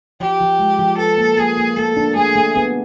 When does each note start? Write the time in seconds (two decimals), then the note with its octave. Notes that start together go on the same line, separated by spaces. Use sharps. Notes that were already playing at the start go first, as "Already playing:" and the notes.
0.20 F3 G4
0.40 F3
0.59 G#3
0.79 F3
0.98 A4 B4
1.18 A#3
1.38 A#3 G#4
1.58 A#3
1.77 A3 A4
1.96 D4
2.16 A3 G#4
2.36 A3
2.56 B3